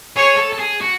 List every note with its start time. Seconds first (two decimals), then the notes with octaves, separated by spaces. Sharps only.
0.16 G#4 C#5
0.37 A4
0.53 A4
0.59 G#4
0.81 F#4